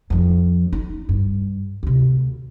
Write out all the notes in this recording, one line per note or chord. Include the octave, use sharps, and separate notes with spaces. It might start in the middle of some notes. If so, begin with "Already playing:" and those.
F2 F3
D#4
G2
D2 C3